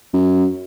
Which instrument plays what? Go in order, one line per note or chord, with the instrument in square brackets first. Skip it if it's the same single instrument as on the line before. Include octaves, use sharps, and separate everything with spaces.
[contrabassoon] F#2